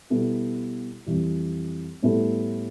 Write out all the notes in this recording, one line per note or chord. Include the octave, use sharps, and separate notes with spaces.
B2 G3 B3 E4 A4
F2 E3 G3
A2 G3 B3 E4 A4